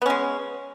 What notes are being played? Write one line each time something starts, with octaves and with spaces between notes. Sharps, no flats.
G#3 B3 C#4